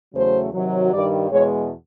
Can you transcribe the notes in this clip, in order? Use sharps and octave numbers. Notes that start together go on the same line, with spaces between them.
E2 C#3 F#3 A3 C5
C3 D#3 F#3
G2 D#3 G3 D5
E2 B2 G#3 C#5